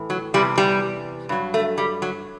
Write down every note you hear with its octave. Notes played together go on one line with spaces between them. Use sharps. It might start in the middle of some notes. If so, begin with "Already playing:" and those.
Already playing: A2 E3
F#3
E2 C3 E3 G3
G3
G2 F#3
A3
G3
F#3